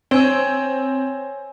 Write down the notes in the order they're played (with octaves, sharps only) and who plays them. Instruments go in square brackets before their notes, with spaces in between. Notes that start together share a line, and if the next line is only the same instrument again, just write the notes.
[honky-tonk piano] C4 [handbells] C#5 G#5 E6